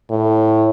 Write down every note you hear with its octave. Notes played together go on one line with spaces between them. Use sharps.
A2